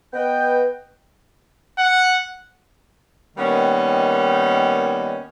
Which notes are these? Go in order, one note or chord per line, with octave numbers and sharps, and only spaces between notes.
B3 B4 D#5 G5
F#5
D#3 G3 A#3 B3 C#4 D#4